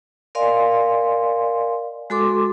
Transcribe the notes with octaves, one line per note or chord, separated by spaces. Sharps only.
A#4 D5 D#5 F5 G#5 C6
G#3 F#4 A4 C6 D6